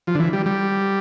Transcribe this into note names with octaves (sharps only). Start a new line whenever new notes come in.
F3
D3
E3
G3
G3